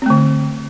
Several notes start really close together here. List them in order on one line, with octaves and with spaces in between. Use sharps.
C4 A3 D3